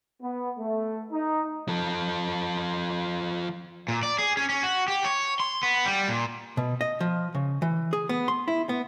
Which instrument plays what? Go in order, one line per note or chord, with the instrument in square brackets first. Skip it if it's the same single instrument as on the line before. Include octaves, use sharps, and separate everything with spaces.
[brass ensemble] B3
A3
D#4
[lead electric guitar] F3 A4
[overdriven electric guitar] A#2
D5
G#4
C#4
C#4
F#4
G4
C#5
C6
B3
G3
A#2
[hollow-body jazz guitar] B2
D#5
F3
C#3
E3
G#4
B3
C6
E4
B3